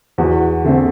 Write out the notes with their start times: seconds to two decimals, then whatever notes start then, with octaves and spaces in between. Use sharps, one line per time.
0.18 E2 F#4
0.64 D3 A3 C4